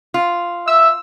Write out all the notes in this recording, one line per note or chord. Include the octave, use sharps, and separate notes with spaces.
F4
E5 E6